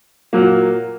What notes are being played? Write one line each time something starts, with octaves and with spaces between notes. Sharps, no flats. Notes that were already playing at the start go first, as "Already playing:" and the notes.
A#2 F#3 A#3